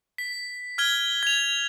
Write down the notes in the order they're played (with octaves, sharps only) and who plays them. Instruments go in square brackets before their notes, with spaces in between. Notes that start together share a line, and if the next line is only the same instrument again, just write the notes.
[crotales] B6
F6 G#6 G7
G#6 F7